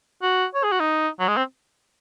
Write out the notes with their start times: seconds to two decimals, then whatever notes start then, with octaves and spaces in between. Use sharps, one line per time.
0.22 F#4
0.54 C#5
0.63 G#4
0.72 F#4
0.80 D#4
1.19 F#3
1.28 G#3
1.37 C4